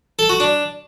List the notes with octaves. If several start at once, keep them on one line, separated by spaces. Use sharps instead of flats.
A4
F#4
D4